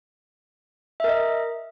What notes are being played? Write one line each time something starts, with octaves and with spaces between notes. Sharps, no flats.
A#4 D#5 E5